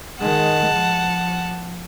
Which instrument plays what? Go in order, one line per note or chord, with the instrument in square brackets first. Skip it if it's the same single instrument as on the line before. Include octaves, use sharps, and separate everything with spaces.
[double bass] D#3 G#3 [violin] F#5 A5
[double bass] F3